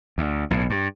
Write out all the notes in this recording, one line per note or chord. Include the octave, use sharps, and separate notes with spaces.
D2
B1 A2
G2